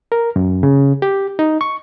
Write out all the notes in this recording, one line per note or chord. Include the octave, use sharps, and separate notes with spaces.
A#4
F#2
C#3
G4
D#4
C#6